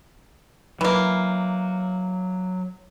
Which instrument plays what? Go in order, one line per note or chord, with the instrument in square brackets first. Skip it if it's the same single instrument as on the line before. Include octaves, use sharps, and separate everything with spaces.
[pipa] E3 A#3 [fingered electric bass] F#3